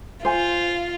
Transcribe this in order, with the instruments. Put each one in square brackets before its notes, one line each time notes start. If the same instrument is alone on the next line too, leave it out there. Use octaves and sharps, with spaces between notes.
[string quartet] F4 [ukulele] C5 G#5